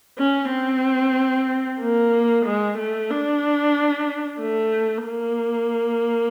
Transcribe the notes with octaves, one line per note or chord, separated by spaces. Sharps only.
C#4
C4
A#3
G#3
A3
D4
A3
A#3